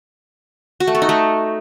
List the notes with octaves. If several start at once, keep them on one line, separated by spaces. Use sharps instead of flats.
F#4
A3
A4
D#4
A3